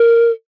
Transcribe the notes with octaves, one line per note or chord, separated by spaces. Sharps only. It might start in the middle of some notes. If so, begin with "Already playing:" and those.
Already playing: A#4